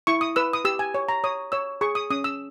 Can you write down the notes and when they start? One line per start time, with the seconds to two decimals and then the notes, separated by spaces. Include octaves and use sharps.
0.07 E4 C#6
0.21 D#6
0.36 B4 E6
0.53 D#6
0.65 G4 E6
0.79 G#5
0.94 C#5
1.09 A#5
1.24 C#5 D#6
1.52 C#5 E6
1.81 G#4 C#6
1.95 D#6
2.10 C#4 D#6
2.24 E6